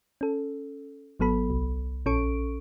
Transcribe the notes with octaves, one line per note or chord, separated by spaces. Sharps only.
C#4 A4
G#1 F#3 B3 A4 B5
C2
A#1 C#4 A4 C#6 D7